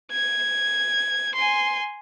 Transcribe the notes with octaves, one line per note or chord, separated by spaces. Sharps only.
G#6
G#5 C6